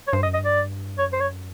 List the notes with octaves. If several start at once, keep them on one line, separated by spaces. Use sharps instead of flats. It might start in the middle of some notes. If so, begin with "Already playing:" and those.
C#5
G2 C5
D#5
F#2
D#5
G2
D5
F#2 C#5
C5
C#5